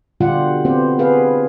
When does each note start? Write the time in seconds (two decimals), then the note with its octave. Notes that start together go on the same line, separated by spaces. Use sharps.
0.20 B2 D3 G3 F4 G4 F#5
0.65 B3 C4 G4 C5
0.99 B3 G#4 B4 F5